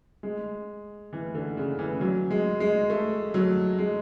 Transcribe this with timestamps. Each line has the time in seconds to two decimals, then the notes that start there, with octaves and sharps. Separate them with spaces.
0.23 G#3
1.13 E3
1.35 D3
1.57 C#3
1.79 E3
2.01 F#3
2.30 G#3
2.60 G#3
2.90 A3
3.34 F#3
3.78 G#3